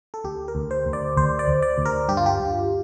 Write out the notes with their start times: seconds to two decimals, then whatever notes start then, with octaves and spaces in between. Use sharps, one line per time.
0.14 A4
0.24 D2 G4
0.48 A#4
0.55 D2
0.71 C5
0.86 D2
0.93 D5
1.17 D2 C5
1.39 D5
1.48 D2
1.62 D5
1.78 D2
1.85 A#4
2.09 G2 G4
2.17 F4
2.26 G4
2.40 G2